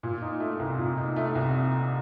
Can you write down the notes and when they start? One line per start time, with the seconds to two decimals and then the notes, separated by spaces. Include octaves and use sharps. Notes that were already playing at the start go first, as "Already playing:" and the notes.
0.03 A#2
0.22 D#4
0.40 A3
0.59 C2
0.78 A#2
0.97 D#4
1.16 A3
1.35 C2